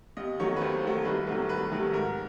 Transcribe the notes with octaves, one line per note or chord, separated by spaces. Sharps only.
D#2 D#5
D#3 F#3 A3 C#5
B4
D#2 C5
D#3 F#3 A3
C2 B4
C3 D#3 F#3 A3
C2 B4
C3 D#3 F#3 A3
G#2 A#4